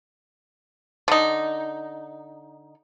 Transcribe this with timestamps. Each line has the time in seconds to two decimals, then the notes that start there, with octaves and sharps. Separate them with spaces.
1.08 D3 D#4